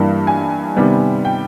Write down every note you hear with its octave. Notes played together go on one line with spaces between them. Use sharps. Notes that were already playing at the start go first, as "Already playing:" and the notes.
Already playing: G2 E3 G3 A#3
G#5
C3 D#3 G3 B3
G5